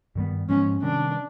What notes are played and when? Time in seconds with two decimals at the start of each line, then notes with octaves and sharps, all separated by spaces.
0.15 G2 D#3 G3 B3
0.49 G#2 F3 G#3 B3 C#4
0.82 C3 D#3 G3 C4 D4